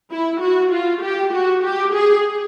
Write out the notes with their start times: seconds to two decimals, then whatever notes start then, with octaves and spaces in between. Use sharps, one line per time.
0.11 E4
0.40 F#4
0.71 F4
1.02 G4
1.32 F#4
1.63 G4
1.93 G#4